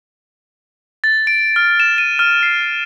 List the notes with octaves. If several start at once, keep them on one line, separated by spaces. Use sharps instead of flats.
A6
D7
F6
E7
D#7
F6
C7